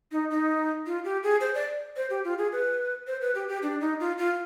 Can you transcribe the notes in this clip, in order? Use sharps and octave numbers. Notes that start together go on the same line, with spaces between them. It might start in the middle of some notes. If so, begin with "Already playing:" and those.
D#4
D#4
F4
G4
G#4
C5
D5
C5
G4
F4
G#4
B4
C5
B4
G4
G4
D4
D#4
F4
F4